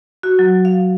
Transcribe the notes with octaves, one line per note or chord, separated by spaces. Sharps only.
F#4
F#3
F5